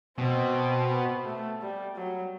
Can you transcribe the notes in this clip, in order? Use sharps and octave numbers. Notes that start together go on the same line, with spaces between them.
B2 C4
B3
A3
G3
F#3